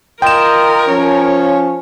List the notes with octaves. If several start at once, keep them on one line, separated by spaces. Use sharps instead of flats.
F4 A#4 D#5 G5 E7
F3 C#4 C#5